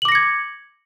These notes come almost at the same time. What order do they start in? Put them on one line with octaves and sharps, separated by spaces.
F#7 D6 A#6 C#7 G#6